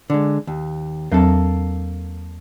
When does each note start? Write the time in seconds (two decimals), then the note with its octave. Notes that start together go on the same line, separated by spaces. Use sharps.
0.10 D3 G#3
0.47 D#2
1.12 E2 F#3 A#3 C4 A4